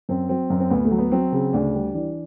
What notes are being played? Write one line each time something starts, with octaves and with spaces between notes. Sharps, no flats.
F#2 C4
F#3 C4
F#2
C4
D2 B3
A3
F#3
B3
F#3 C4
C#3
D2 D4
G3
E3 D4